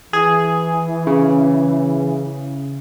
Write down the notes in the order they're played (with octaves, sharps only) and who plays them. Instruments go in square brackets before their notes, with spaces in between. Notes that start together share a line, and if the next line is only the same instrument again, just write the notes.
[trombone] E3 [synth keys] G#4
[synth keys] C#3